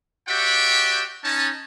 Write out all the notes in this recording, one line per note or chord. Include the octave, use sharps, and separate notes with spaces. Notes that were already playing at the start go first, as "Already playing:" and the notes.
F#4 G4 D5 E5 F#5 G5
C#4 D#4 A5